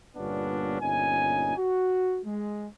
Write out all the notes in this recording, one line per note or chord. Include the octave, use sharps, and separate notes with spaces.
G1 A#2 G3 B3 C#4 D4
G1 A#2 C#4 D#4 G#5
F#4
G#3